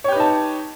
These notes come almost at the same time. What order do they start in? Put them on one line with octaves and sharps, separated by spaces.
C#5 G4 B4 D#4 A5